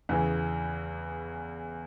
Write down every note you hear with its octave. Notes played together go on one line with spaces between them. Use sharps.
E2 C#3 E3